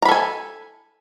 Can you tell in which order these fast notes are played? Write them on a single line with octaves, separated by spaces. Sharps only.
A#5 B5 A4 G#5